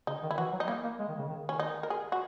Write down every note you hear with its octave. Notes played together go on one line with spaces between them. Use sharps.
C#3 D#4
D#3
E4
E3 F#4
F#3
D#4
A#3 E4
A#3
G#3
D#3
C#3
D#3
D#3 C#4
D#4
A#4
G#4
F#4